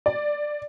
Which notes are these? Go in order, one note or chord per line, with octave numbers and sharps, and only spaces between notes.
D5